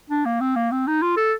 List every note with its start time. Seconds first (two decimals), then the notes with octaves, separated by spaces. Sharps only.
0.10 D4
0.25 A#3
0.40 C4
0.56 A#3
0.71 C4
0.87 D#4
1.02 F4
1.17 A4